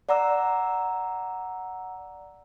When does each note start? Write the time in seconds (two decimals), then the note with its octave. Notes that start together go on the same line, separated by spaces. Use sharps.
0.09 D5 F#5 A#5 D6 E6